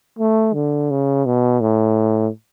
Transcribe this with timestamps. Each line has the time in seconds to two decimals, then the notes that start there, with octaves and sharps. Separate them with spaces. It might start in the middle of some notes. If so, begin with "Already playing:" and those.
0.19 A3
0.54 D3
0.91 C#3
1.26 B2
1.61 A2